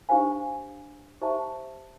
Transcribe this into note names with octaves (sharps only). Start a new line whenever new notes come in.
D4 G4 C5 F5 G#5
G4 C5 E5 A5